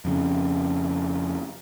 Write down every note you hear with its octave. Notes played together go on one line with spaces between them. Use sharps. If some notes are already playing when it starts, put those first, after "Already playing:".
F2 C#3